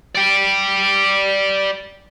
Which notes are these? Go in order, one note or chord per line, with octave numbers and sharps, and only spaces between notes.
D5 G5